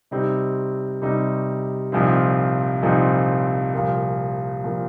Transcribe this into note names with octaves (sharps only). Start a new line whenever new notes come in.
C3 G3 C4 D#4
C3 G3 C4 D#4
C2 A#2 F3 C4 D#4
C2 A#2 F3 C4 D#4
C2 A#2 F3 A#3
A#2 F3 A#3